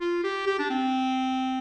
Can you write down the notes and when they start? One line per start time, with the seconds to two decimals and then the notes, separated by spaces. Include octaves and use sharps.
0.01 F4
0.24 G4
0.47 G4
0.59 D4
0.70 C4